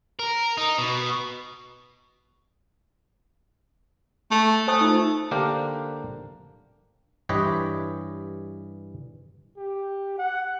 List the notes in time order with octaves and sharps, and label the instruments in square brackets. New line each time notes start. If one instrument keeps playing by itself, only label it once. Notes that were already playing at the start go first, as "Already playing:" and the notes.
[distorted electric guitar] A#4
D#4
B2
[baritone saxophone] A3
[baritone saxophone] A3 [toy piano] C5 G#5 D#6
[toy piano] D#4 F4
[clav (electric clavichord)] D3 A#3 D4 G4 A#4 C5
G2 E3 G4 B4 C#5 D#5
[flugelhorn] G4
F#5